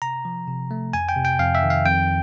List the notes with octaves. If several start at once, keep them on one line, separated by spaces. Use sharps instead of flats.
C3 A#5
F3
C3
A3
F2 G#5
G5
C3
G5
F2 F5
E5
D#3
F5
F2 G5